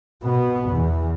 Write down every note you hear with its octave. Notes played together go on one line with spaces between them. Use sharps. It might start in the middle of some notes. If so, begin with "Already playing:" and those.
B2 B3
E2